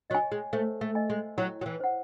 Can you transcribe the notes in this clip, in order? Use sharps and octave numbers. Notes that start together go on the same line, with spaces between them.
F#3 D#5 G#5
G#3
A3 C5
A3
D#5 G#5
G#3
F#3 E4
F#3
E3
C5 F#5